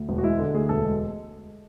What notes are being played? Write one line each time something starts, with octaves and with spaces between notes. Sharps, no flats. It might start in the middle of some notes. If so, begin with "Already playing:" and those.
Already playing: D2
E1
F#4
G#3 E4
D3
D2 G#4
E1 A4
G#3